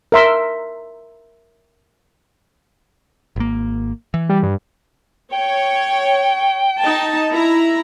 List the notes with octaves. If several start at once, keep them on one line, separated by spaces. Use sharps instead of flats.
A#4 E5 C6
G#1 A#3
E3
G3
G2
C#5 G5
D#4 A5
E4 A#5